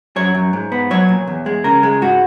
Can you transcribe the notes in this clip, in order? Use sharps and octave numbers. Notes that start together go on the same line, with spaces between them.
F#2 C#5
F#2
G#2
B3
F#3 C#5
A#2
E2
G#3
C#3 A#4
G#3
G#2 F#4